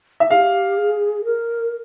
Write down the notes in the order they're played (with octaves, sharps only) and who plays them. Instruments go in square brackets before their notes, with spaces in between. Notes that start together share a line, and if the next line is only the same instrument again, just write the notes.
[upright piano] E5
[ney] G#4 [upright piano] F5
[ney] G4
G#4
A#4